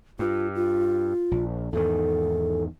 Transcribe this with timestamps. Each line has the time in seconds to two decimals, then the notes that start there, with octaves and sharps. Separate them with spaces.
0.19 G2 F4
0.55 F4
1.31 A#1
1.73 E2 G#2 D#3 A4